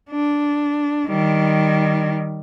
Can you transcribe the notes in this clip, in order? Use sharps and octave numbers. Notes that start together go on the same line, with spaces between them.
D4
D#3 G3